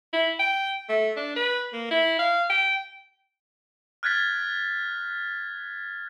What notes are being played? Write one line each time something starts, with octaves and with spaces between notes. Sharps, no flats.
E4
G5
A3
D4
B4
A#3
E4
F5
G5
F6 F#6 G#6 A6 B6